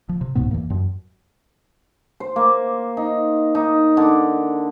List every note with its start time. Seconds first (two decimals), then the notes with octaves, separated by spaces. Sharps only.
0.09 F3
0.21 C3
0.35 C2 G#2 B2 B3
0.51 E2 E3 A#3
0.70 F#2
2.20 C5
2.36 A#3
2.97 D#4
3.55 D#4
3.97 D3